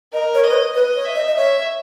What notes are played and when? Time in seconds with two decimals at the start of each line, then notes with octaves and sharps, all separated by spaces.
0.13 A#4 D#5
0.34 C#5
0.44 D#5
0.50 B4
0.54 C#5
0.74 B4 D#5
0.95 C#5
1.05 E5
1.15 D#5
1.28 D#5
1.36 C#5 E5